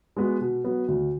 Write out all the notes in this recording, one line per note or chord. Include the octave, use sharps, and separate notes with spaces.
G#3 B3 F#4
B2
F#3 B3
D2